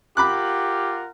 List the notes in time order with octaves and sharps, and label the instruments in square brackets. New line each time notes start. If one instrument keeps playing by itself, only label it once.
[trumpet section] F4 A#4 F#5 [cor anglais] G4 [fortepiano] B5 D6 F#6